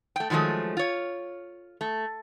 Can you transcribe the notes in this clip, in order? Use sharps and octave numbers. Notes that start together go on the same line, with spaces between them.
A3 G5
A2 D#3 F3 F#3 G#3 A3
F4 C#5
A3